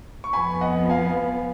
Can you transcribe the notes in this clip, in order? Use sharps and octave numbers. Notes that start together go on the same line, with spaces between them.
C#6
F2 F3 B3 G#5 B5
D#5 F#5
F5 G#5